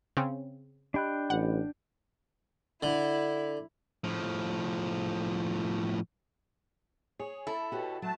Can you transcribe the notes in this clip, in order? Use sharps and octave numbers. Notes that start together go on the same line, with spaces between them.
C#3 C4
D4 G4 D#5 G5 B5 F#6
A1 F#5
D3 E4
A2 F3
G#4 C#5
E4 A4
B2 F#4 G4 C#5
F#3 A3 A5